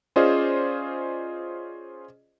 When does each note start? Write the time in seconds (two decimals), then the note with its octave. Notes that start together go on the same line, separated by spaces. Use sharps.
0.16 C#4 F4 G#4 C5 D5 D#5